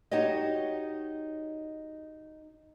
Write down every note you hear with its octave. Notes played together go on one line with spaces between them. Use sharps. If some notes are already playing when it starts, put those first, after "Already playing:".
D#4 F#4 G4 C#5 D#5